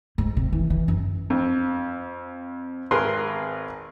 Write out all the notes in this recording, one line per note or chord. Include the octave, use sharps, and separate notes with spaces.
G#2
C3
E3
E3
F#2
F2
G#1 G#4 A#4 B4 C6